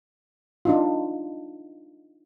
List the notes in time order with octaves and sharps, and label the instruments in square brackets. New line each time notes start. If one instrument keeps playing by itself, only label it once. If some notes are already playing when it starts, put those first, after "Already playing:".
[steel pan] D4 D#4 F4